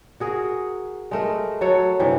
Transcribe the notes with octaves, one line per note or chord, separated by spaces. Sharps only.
F#4 G#4 A#4
G#3 A3 A#4
F#3 F#4 A4 C#5
G2 C3 E3